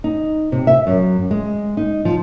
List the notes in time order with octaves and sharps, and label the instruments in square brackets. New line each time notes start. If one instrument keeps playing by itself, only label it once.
[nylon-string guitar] D#4
C3
E5
F#2
G#3
D#4
F3